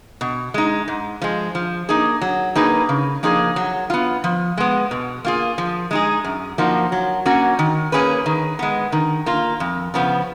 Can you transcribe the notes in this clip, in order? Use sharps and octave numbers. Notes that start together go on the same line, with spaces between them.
B2
G#3 D#4
G#2
F3 G#3
F3
A#3 D#4 G#4
F#3
A#3 D#4 G#4 B4
C#3
F3 A#3 D#4 G#4
F#3
B3 F4
F3
G#3 B3
B2
A#3 F4 G#4
F3
G#3 D#4 G#4
F#2
F3 A#3 D#4 F#4
F#3
A#3 C#4 F#4 C#5
D#3
A#3 C#4 G#4 B4
D#3
G#3 B3
D#3
A#3 F4
F2
C#3 F3 B3